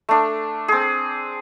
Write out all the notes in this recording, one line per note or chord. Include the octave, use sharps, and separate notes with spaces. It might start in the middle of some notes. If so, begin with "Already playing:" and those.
A3 D4
C4 G#4